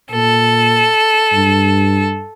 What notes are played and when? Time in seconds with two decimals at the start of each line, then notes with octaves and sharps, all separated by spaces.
0.12 A#2 A4
1.33 G2